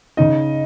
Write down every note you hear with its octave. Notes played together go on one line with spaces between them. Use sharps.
C#3 D#4 D#5